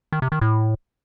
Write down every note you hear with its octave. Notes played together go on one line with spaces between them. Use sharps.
D#3
C3
D#3
A2